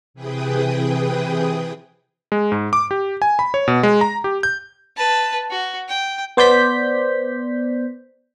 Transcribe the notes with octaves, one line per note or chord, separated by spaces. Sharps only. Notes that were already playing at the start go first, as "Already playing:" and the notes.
C3 E3 G#4 B4 G5 D#6
G#3
G#2
D6
G4
G#5
B5
C#5
B2
G#3
A#5
G4
G6
B4 A5
F#4
G5
B3 C5 D5 G6 B6